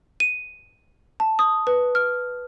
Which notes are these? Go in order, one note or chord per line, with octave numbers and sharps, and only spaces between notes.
D#7
A5
D#6
B4
F6